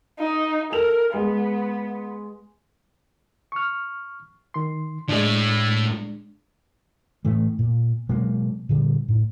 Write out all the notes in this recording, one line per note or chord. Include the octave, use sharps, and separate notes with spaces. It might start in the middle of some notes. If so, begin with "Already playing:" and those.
D#4
A4 A#4 F7
G#3 B3
C#6 F6
D#3 C6
A2 G#3 D4
A2 E3 A3
A#2
B2 F#3 G#3 A#3
A#2 D3 G3
A2